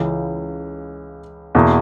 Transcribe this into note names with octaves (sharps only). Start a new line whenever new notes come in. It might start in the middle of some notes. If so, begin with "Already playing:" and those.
Already playing: C#2 C#3 E3
E2 B2 A#3 E4